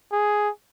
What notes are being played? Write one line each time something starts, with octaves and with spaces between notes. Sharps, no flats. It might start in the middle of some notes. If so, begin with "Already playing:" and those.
G#4